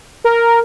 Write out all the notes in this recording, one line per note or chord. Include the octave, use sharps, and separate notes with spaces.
A#4